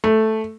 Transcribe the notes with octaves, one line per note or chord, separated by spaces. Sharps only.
A3